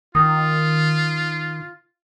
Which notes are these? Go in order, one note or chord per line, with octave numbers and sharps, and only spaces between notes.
D#3 F4 D#6